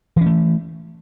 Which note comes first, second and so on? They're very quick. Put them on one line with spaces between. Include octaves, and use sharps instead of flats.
E3 C#4 A3